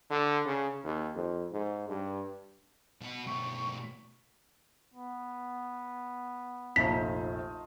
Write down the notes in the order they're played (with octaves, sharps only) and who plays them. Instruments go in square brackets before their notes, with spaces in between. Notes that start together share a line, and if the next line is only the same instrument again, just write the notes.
[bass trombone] D3
C#3
D#2
F2
G#2
G2
[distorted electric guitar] B2 F#5
[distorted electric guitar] B2 A3 [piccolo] C#6
[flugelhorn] B3
[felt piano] F1 A#1 [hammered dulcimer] A3 D#4 F4 [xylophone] B6